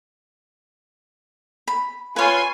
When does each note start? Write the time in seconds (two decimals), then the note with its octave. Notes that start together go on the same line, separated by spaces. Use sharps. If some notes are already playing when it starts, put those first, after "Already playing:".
1.68 B5
2.16 F4 B4 C#5 G#5 C6